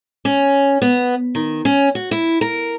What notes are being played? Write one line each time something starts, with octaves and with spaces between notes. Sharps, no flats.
C#4
B3
D#3
C#4
F#4
E4
A#4